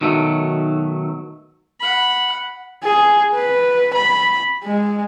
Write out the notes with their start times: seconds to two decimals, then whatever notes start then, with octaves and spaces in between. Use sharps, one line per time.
0.01 B1 D#3 F#3 A3
1.80 F#5 B5
2.84 G#4
3.34 B4
3.94 B5
4.64 G#3